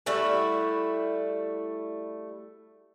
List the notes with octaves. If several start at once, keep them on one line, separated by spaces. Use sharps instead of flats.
G3 A3 E4 F#4